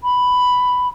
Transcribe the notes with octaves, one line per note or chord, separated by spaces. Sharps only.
B5